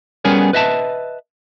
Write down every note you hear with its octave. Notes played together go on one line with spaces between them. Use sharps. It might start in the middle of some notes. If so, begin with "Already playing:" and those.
G3 B3 C#4 G#4 A#4 C#5
B4 D#5 E5 A5